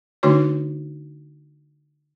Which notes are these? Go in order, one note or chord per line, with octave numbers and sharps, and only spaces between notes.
D3 A3 D4 D#4 F#4 C#5